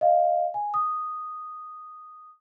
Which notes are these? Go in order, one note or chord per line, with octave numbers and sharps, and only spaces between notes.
D#5 F5
G#5
D#6